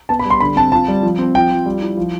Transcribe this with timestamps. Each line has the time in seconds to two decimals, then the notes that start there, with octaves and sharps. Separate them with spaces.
0.09 B3 A5
0.19 B5
0.25 G3
0.30 C6
0.40 D3 B5
0.56 C4 A5
0.72 F4 A5
0.88 G3
1.03 F3
1.19 C4
1.35 F3 G5
1.50 F3
1.66 G3
1.82 E4
1.97 F3